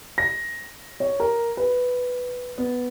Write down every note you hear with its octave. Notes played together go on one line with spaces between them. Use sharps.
A#6
C#5
A#4
B4
B3